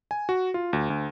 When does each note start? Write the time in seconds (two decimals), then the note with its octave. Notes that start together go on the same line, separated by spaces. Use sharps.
0.11 G#5
0.29 F#4
0.54 F4
0.73 D2
0.90 D2